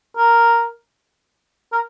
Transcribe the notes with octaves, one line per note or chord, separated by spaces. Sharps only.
A#4
A#4